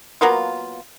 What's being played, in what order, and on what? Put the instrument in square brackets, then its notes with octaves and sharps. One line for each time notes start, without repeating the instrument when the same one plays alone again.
[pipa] F#3 A#3 B3 F4